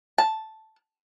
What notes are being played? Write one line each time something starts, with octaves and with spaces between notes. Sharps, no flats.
A5